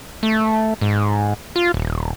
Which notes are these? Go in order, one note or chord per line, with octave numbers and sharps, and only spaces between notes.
A3
G#2
F4
D#1